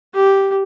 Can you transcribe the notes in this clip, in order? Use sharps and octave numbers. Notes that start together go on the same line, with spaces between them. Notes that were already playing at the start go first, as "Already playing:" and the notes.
G4